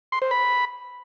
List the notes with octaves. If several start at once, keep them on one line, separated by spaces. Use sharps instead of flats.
C6
C5
B5